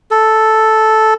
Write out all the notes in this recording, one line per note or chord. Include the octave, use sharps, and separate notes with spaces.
A4